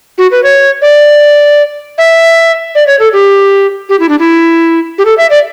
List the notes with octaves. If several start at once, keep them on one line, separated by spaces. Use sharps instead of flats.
F#4
B4
C#5
D5
E5
D5
C#5
A4
G4
G4
E4
D4
E4
G4
A4
E5
D5